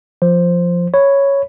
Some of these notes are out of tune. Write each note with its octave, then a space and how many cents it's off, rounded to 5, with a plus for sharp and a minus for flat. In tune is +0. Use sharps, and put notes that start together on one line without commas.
F3 +0 C5 +0
C#5 +0 B5 +0